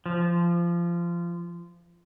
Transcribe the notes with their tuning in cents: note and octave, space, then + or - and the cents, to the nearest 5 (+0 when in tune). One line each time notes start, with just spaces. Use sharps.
F3 -20